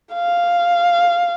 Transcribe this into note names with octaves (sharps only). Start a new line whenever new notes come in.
F5